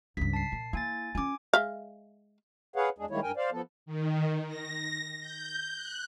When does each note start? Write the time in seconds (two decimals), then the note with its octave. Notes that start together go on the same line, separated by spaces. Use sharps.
0.17 C#2 G2 B6
0.33 A5 C7
0.52 A#2
0.73 A#3 E4 G#5 A6
1.15 C#4 F4 G#5 D6
1.53 G#3 E5 F5
2.76 G#4 B4 C#5 F5 F#5
2.98 E2 G#3 D4 G#4
3.10 D#3 G3 G#3 A#3 E4 C#5
3.23 G2 A#4 G5 G#5
3.37 C5 D5 F5
3.52 F3 B3 A4
3.86 D#3
4.47 A#6
5.20 G6
5.74 F#6